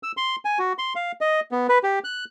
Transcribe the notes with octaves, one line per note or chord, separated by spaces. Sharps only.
E6
C6
G#5
F#4
C6
F5
D#5
B3
B4
G4
F#6